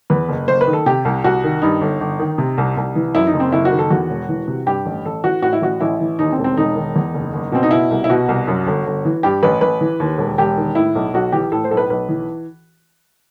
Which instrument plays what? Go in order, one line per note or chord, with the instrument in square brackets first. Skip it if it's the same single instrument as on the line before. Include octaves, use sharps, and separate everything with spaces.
[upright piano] E2 B4
F#1
F#1 C5
B4
D#3
A4
C3 G4
C2
C2 F#4
D#3
G2 D#4
G1
G1
D#3
C3
C2
C2
E3
F#2 E4
D#4
F#1
C4
F#1 E4
F#4
D#3
A4
E2 F#4
E1
E3
C3
G2 G4
A1
A1 A4
E3 F#4
A2 F#4
E4
A1 F#4
A1 E4
E3
D#2 D#4
C4
E1
C4
E1 D#4
D#3
E2
F#1
F#1
B2 C4
D#4
B2 E4
C2
E4
B2 F#4
C2
F#2
G1
G1
E3
G2 G4
A1 B4
A1 B4
E3
D#2
E1
E1 G4
D#3
A2 E4
B1
B1 F#4
E3 G4
A2 A4
C5
B1 A4
B4
B1 B4
E3